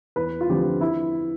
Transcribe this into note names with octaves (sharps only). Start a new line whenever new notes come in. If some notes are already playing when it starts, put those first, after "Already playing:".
E2 B4
F4
D3 F3 C4 G4
E4